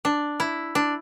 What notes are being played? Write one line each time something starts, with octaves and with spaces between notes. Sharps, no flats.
D4
E4
D4